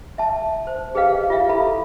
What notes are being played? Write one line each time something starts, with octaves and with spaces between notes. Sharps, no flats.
E5 A5
C5
G4 G#4 B4 D#5 F5
F4 G4 E5 F5
E4 A4 B5